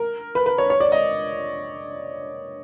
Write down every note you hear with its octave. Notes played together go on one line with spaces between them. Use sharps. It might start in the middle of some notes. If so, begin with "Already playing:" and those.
Already playing: A#4
B4
B4
C#5
C#5
D5
D#5